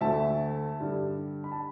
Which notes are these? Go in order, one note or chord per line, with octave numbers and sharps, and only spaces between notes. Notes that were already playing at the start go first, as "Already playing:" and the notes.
D2 D3 A3 E5 A5
G2 D3 G3
B5
A5